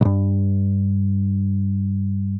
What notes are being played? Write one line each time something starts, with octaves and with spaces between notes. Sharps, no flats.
B1 G2